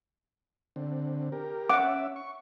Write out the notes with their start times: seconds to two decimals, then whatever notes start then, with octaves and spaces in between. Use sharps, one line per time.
0.76 D3 C4
1.32 G4 A#4
1.70 C#4 E5 F#5 D6
2.16 C#6